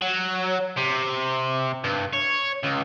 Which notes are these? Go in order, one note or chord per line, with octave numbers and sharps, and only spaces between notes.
F#3
C3
G2
C#5
C#2